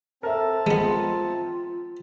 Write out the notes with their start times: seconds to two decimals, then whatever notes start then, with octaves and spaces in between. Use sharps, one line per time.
0.23 C4 A4 A#4 E5 A5
0.67 G#3 B3 F4